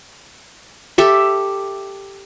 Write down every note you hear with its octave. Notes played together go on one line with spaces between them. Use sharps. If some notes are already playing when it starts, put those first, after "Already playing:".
G4 A4 E5